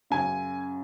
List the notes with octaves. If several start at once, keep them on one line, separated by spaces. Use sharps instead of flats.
F#2 C#3 G#5